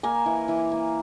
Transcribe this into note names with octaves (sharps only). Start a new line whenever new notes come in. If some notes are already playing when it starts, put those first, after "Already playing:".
A#3 G#5
E3
E3
A#3